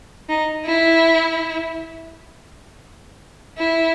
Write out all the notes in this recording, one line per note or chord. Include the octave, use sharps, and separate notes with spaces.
D#4
E4
E4